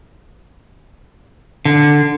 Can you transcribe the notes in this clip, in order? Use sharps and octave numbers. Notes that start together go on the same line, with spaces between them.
D3